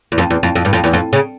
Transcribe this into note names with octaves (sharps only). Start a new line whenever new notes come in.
E2
F2
E2
F2
F2
G2
F2
E2
F2
C#3